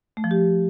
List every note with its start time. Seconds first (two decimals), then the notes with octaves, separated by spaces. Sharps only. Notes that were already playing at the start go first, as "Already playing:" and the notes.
0.17 A3
0.24 F3
0.31 G4